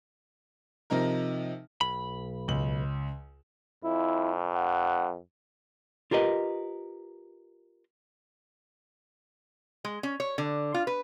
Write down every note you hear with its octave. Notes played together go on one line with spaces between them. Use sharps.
C3 F3 D#4 A#4
B1 B5
C#2 F#7
F2 E4
F#5
F4 G4 A#4 B4 D#5
G#3
C#4
C#5
D3
F4
B4